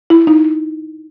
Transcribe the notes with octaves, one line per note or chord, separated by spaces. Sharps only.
E4
D#4